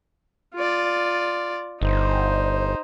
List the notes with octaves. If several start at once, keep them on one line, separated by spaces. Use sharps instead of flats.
F4 D5
G1 D#4 C5